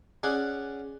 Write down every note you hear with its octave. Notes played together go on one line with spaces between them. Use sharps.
C#4 G#4 D5 F#5